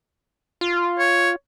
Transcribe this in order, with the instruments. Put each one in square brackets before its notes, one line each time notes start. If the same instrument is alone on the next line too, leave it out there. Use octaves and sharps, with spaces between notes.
[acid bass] F4
[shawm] C#5